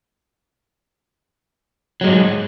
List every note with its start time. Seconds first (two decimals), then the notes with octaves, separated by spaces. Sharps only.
2.01 F#3
2.04 G#3
2.07 G#2